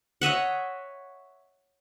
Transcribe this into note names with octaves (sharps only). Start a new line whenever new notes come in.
C#5 D#5 E5 F#5